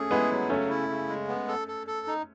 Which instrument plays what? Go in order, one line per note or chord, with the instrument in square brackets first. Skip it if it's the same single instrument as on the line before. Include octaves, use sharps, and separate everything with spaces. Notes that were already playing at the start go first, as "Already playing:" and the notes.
Already playing: [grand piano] A3 C#4 [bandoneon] G#4
[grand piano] G#3 B3 [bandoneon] E4
[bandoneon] F#3
[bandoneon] C#3 [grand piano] A3 C#4
[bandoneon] E4
C#3
G#3
B3
A4
A4
A4
D#4